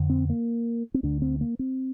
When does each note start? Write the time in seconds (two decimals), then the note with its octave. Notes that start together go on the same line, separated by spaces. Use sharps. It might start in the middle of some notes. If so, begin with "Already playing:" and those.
Already playing: F2 D3
0.10 C4
0.29 A#3
0.94 C4
1.03 D2 D3 D4
1.22 C4
1.41 A#3
1.59 C4